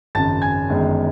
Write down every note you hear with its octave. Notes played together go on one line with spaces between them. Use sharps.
G#1 F#2 C#3 A5 A6
G#5 G#6
G1 F#2 D#3 G#3